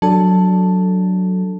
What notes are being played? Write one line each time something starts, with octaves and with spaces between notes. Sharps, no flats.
F#3 D4 A4 A5